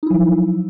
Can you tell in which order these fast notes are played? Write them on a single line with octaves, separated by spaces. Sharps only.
D#4 E4 F#3 F3